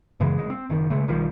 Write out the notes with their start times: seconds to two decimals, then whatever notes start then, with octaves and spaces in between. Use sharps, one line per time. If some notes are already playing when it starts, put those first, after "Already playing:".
0.20 F#2 C#3 E3 G#3
0.38 F#1 G#3
0.50 C4
0.70 F#1 D#3
0.90 C#3 G#3 A3
1.08 B1 D#3 F3 G3